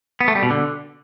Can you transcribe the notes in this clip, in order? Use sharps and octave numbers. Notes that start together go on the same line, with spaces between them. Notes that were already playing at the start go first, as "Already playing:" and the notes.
B3
A3
G3
B2
D3